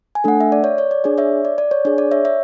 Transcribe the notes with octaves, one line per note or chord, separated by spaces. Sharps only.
G#5
A3 D4 A4 F#5
E5
D5
C#5
C#5
D5
D4 G#4 D5
C#5 E5
D5
D5
C#5
D4 G#4 C#5
D5
C#5 E5
C#5 E5